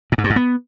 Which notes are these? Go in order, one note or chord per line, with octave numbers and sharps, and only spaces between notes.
A#2
G#2
G2
G#2
B3